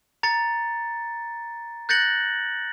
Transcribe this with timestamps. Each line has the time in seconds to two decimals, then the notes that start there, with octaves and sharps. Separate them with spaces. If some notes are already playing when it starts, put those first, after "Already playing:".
0.23 A#5 A6 C#7
1.89 F#6 G6 A6 A#6 C#7 F#7